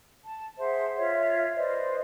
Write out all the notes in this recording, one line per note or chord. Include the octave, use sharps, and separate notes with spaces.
A5
G#4 C5 E5 F#5
F4 C#5 E5
B4 C5 D5 D#5